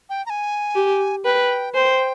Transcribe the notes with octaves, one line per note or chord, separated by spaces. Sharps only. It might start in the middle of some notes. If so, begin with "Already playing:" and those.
G5
A#5
G#5
G4
B4 G5
C5 G5 G#5